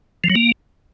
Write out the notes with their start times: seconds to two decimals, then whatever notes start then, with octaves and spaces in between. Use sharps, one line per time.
0.24 F3
0.30 F#3
0.35 A#3